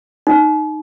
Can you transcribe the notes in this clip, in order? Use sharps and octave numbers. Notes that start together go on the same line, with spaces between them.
D#4